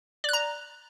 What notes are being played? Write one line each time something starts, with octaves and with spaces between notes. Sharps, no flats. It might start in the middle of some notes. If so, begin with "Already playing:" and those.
D5 A#5 F#6